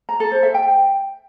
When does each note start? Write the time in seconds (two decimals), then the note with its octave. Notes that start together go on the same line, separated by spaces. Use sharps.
0.09 A#5
0.20 A4
0.32 C5
0.43 E5
0.54 G5